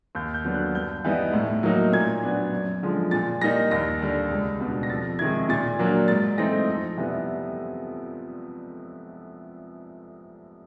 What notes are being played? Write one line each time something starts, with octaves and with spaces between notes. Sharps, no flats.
D#2 G6
G6
D3 F#3 B3 D4
F#6
G2 G6
E3 G3 B3 D#4
A2
F#3 A#3 D#4
A#2 G#6
F#3 B3 D4
F#2
D3 F3 G#3
A#2 A6
G3 A#3 D#4 A#6
D#2 A#6
D3 G3
C#2
B2 G3 B3 D4
A#6
F2 A6
C3 D#3 G#3 G#6
A#2 A6
F#3 A#3 D4
G#2 A6
E3 A3 C4 D#4 A#6
F2
C3 E3 G3 B3